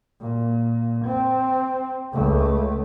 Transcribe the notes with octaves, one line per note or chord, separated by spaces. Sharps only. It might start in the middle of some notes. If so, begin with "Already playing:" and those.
A#2
C4
C#2 A3